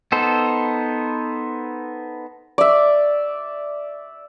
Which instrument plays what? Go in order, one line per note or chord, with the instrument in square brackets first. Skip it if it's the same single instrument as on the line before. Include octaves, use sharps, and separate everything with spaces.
[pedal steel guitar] B3 D#4 A4 C5
[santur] D5 E5